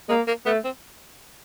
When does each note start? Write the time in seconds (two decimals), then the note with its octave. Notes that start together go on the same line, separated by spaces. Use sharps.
0.09 G#3 A#3
0.27 A#3
0.46 A3 B3
0.64 C4